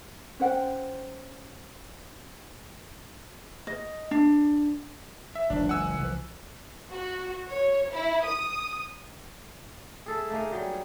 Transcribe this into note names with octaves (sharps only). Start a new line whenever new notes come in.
C#4 C5 F#5 G5
D#5
D4
E5
F#1 C#2 E3 D4
F#5 G#5 E6
C2 E3 F3
F#4
C#5
E4
D#6
G#4 A4 E5
A3 A#3 D#4 G#4
F#3 G3 G#4